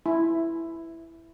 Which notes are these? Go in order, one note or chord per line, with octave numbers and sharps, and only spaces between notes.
E4